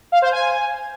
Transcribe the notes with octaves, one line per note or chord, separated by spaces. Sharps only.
F5
C5
G#5